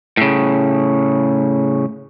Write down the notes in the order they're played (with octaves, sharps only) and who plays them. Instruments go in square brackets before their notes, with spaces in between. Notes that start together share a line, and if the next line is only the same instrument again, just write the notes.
[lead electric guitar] A2 C#3